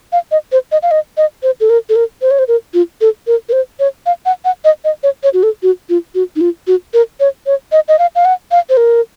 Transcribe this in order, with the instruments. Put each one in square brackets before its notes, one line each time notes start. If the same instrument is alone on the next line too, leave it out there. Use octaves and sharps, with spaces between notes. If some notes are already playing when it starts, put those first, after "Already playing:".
[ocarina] F5
D#5
C5
D#5
F5
D#5
D#5
C5
A4
A#4
A4
A#4
C5
C#5
C5
A#4
F4
A4
A#4
A#4
C5
C#5
F5
F#5
F#5
D#5
D#5
C#5
C#5
F#4
A4
F#4
F4
F#4
D#4
F4
F#4
A#4
C#5
C#5
D#5
D#5
F5
F5
F#5
F5
C5
A#4